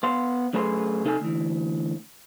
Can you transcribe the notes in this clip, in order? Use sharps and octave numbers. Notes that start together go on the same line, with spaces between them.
B3 F5 C6
F#2 A3 G#4 B4 B5 C6
C3 D#4 A4 F#5 G#5
D2 E3